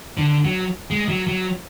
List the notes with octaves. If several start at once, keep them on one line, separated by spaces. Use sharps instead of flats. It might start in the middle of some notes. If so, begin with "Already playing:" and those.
D3
F#3
G#3
F#3
F#3